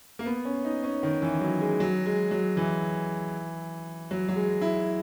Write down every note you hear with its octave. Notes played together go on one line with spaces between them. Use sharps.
A#3
B3
C#4
D#4
C#4
D#3
E3
F#3
G#3
F#3
G#3
F#3
E3
F#3
F#3
G#3
E4